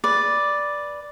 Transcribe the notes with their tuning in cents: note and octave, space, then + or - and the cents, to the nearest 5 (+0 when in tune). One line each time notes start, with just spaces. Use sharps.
B4 -5 D5 +0